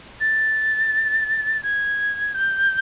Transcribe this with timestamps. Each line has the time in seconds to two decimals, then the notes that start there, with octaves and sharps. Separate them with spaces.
0.20 A6
1.63 G#6
2.34 G6